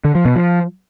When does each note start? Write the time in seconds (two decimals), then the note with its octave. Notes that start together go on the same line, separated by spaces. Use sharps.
0.05 D3
0.15 F3
0.25 B2
0.36 F3